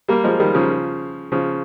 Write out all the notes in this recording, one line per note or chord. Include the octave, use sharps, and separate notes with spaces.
G3 A#3
F3 G#3
D#3 G3
C#3 F3
C#3 F3